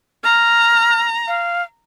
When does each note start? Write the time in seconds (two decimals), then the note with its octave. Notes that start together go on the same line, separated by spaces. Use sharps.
0.24 A#5 F6
1.28 F5